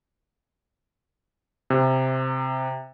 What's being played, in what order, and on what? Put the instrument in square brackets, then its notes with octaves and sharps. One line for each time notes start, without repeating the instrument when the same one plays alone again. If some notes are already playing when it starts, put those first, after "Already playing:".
[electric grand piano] C3